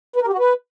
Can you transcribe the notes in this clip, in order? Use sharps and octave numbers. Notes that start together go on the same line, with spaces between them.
B4
A#4
G4
F#4
B4